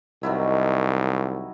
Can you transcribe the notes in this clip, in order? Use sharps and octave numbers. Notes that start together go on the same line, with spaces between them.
C2 D#3 F#3 E4